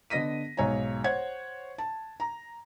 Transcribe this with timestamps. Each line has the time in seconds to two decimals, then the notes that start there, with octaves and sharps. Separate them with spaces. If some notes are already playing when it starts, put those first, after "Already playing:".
0.10 D3 B3 D#5 A#6 B6 D#7
0.57 B1 G#2 C#5 G#5 A#5
1.04 C5 C#5 F#5 G#6
1.78 A5
2.20 A#5